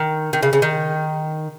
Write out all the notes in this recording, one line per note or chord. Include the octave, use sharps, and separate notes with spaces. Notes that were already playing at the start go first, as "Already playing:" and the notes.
Already playing: D#3
D#3
C#3
C#3
D#3